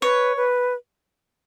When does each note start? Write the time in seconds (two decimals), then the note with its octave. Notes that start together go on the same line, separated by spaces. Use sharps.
0.02 B4 C#5
0.37 B4